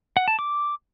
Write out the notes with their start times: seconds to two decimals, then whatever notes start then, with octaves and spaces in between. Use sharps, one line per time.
0.17 F#5
0.28 A5
0.39 D6